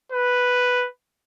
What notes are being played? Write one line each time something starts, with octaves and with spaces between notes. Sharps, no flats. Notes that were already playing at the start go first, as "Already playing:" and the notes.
B4